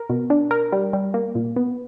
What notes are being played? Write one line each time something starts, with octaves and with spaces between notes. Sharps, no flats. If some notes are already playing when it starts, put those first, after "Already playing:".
Already playing: A#4
B2
D4
A#4
G3
G3
A#3
A#2
B3